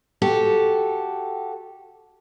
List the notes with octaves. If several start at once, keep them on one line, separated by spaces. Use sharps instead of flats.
F#4 G4 A4